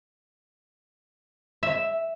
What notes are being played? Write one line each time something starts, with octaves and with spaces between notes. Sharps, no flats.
E5